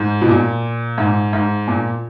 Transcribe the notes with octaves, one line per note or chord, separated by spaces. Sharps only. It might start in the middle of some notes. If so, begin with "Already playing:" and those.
Already playing: G#2
B2
A#2
G#2
G#2
A#2